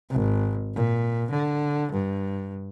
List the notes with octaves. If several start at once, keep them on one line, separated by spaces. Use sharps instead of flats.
G#1
A#2
D3
G2